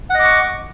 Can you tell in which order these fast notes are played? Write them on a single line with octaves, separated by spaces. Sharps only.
F#5 D#5 D6 C#6